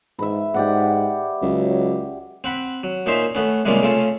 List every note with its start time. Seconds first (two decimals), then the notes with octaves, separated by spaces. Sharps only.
0.19 G#2 B4 E5
0.54 G#2 G4 D5 F#5
1.42 C#2 F#3
2.44 C4 F#5 B5
2.83 F#3
3.06 A#2 C#4 D#4 C5 E5 C6
3.35 A3 B3 C#4
3.65 C3 G3 G#3 A#3 C#4 F4
3.82 C#3 A3 C#4 F4 A4